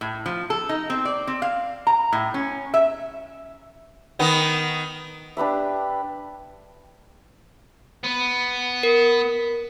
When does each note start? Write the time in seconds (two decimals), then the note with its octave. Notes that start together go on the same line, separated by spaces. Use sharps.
0.01 A2
0.26 F3
0.50 A4
0.69 D#4
0.90 C4
1.05 D5
1.27 C4
1.42 F5
1.87 A#5
2.13 A2
2.34 C#4
2.74 E5
4.19 D#3 B3 D#4
5.37 D4 G4 B4 E5
8.04 B3
8.83 A#4